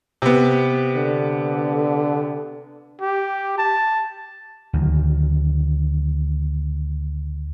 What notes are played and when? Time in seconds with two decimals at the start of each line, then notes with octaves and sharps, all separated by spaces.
0.22 C3 B3
0.96 D3
3.01 G4
3.58 A5
4.73 D2 D#3 F#3